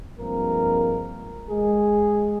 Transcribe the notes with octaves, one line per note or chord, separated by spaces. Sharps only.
G2 F3 G#3 A#3 C4 A#4
G#3 G#4